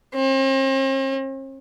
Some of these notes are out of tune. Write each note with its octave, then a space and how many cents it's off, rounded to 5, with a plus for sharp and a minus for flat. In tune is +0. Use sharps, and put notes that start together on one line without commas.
C4 +45